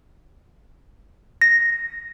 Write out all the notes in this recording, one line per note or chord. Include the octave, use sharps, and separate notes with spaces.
A#6